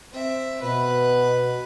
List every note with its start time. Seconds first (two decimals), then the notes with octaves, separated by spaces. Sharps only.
0.12 C4 E5
0.62 B2 B4